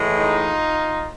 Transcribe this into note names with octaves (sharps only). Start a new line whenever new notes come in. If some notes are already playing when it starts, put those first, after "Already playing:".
Already playing: A2 E3 G#3
D#4 F4